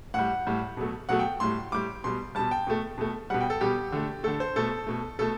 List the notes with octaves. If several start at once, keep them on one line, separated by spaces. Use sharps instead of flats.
A2 G3 F#5
A2 G3
B2 F#3 A3
B2 F#3 A3 F#5
G5
A2 G3 C6
A2 G3 D6
B2 G3 C6
B2 G3 A5
G5
B2 A3
B2 A3
B2 G3 F#5
G5
A4
B2 G3 G4
D3 A3
D3 A3 A4
C5
B2 A3 A4
B2 A3
B2 A3 A4